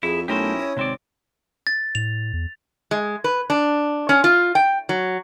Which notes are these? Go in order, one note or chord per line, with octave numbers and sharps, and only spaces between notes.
F2 E4 G#4
B1 A3 C#4 E4 G4 A#4 C5 D#6
C#5
G#1 C3 C4 D5
A6
A2 F7
E2
G#3
B4
D4
C#4
F4
G5
F#3